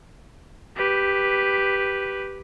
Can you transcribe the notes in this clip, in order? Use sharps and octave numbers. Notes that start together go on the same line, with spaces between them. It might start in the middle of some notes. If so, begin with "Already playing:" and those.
G4 B4